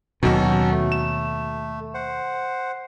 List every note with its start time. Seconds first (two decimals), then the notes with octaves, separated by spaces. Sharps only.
0.23 D#2 B2 F#3 C#4 D#4 F#4 A4
0.72 A3
0.92 E7
1.94 C5 F#5